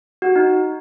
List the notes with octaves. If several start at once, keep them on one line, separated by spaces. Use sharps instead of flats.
F#4
D#4